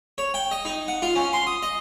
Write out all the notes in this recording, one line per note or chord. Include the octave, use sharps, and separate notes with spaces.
C#5
G5
D#5
D#4
F#5
F4
C#4
C6
D#6
D#5